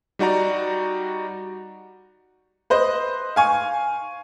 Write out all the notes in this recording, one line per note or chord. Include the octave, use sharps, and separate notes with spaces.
G3 D#4 F#4 D5 A#5
B4 C5 D#5
F5 G#5 C#6